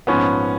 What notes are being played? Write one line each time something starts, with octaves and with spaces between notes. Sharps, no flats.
A#1 G#2 F3 B3 C#4